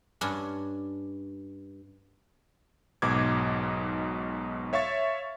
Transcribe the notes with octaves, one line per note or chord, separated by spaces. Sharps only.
G2 C#4 D4
B1 G#2 B2 D6 G#6
C#5 E5 F5 C#6 A6